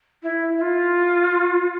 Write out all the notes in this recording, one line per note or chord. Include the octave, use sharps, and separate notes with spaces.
E4
E4
F4